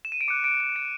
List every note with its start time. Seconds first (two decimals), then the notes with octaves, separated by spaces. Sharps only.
0.05 E7
0.12 D#7
0.21 D7
0.28 D6 F#6 C#7
0.44 D7
0.60 D7
0.76 D7